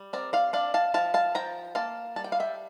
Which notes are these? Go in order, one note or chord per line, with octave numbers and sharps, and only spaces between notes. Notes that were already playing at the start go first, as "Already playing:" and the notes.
Already playing: G3
C4 A#4 D5
D5 F5
D4 D5 F5
F5 A5
F3 F5 A5
F5 A5
F3 G5 A#5
A#3 F5 A5
G3 A5
G5
F5
E5 G5